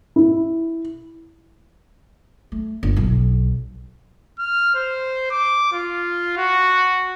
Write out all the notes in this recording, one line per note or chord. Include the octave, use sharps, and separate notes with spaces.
E4
A3
G1
B1
F6
C5
D6
F4
F#4